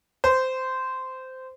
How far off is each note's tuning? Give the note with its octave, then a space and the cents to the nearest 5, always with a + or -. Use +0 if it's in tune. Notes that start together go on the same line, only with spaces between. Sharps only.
C5 -15